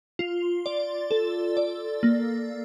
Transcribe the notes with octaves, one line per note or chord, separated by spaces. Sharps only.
F4
D5
A4
D5
A#3